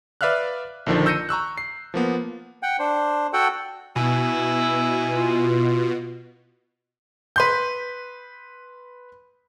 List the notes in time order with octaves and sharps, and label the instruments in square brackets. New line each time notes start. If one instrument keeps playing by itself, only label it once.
[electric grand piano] B4 D5 E5 F5 F6 F#6
A#1 D3 D#3 F3
E6 G6 A#6 C#7 D#7
A#5 C#6 E6 F#6
C7
F3 A#3 B3
[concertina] F#5 G5
D4 C5
F#4 A4 F#5 G5
[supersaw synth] B2 [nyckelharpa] E4 [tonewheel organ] G#5
[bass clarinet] F4
[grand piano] B4 C6 G6